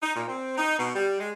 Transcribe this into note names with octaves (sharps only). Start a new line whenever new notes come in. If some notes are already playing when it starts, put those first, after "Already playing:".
D#4
A#2
C4
D#4
B2
G3
G#3